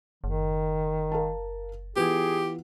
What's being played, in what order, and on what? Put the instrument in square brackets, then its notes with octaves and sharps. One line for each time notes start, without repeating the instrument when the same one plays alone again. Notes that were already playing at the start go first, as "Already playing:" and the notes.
[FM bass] F#1 [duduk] D#3
[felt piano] A#4 F5 A5
[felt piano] E3 B3 F4 [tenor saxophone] G4 [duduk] G#4